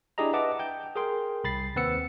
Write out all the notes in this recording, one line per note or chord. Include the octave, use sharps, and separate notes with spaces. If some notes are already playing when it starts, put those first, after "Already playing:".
D4 E4 G4 G#4 D#5 A#5
B4 D#5 E5 F#5 A5 D6
G5 G6
G#4 A#4 G5 C6
C2 B5 A6 C7
D#2 C4 B4 F#5 E6 C#7